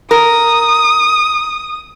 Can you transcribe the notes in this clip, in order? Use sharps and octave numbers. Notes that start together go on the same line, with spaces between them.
A#4 D#6